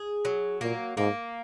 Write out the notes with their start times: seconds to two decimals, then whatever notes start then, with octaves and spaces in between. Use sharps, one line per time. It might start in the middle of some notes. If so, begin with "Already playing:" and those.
Already playing: G#4
0.25 F#3
0.61 A#2 A#3
0.97 G#2 A#3